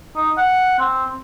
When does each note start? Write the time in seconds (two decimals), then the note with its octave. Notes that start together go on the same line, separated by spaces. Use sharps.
0.16 D#4
0.37 F#5
0.79 C4